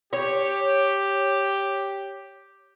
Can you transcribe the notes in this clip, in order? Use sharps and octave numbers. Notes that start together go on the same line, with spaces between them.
G4 C#5